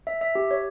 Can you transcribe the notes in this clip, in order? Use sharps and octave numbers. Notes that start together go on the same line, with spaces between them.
E5
E5
G4
C#5